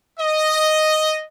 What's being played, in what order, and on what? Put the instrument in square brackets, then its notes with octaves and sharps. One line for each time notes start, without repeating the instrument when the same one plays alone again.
[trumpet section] D#5